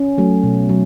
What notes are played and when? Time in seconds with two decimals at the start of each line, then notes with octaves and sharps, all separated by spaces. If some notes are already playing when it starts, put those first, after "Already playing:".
Already playing: C#4
0.18 F#3 A3
0.43 B2
0.69 F#3